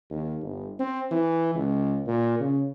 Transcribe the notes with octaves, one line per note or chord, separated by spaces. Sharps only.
D#2
G1
C4
E3
C#2
A#2
C#3